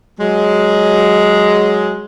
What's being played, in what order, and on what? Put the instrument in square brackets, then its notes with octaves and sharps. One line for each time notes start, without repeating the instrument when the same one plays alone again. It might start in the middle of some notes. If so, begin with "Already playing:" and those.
[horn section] F#3 G#3